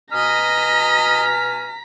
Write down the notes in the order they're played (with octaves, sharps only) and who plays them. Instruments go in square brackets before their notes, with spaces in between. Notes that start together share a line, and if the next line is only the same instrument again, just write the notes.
[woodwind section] B2 G#5 F6 [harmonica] D#5 [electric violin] A#5 B6